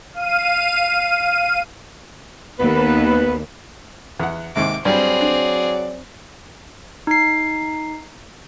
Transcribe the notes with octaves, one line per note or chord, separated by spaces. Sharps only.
F5 D#7
D#2 B3 B4
E2 F#5
D#2 G#2 C3 D6
G2 F#3 G3 C4 G#4 D5
D4
D#4 C7